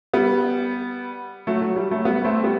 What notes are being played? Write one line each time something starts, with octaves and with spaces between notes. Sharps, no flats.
G3 B3
F#3 A3
F#3
G3
F#3 A3
G3 B3
A3 C4
G3 B3